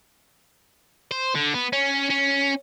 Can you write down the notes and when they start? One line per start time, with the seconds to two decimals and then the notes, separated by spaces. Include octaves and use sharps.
1.11 C5
1.35 D3
1.54 B3
1.73 C#4
2.10 C#4